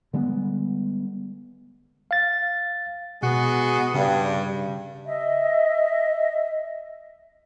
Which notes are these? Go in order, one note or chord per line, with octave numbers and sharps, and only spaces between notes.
D3 G3 G#3 B3
F5 A6
B2 G#3 B3 F#4
G2 C#3
D#5 E5